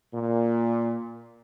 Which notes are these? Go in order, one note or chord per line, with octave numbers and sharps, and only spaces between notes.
A#2